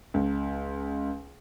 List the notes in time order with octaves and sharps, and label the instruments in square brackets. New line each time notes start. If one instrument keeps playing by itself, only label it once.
[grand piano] C#2